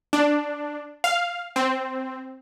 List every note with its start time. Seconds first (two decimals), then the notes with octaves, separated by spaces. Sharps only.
0.13 D4
1.04 F5
1.56 C4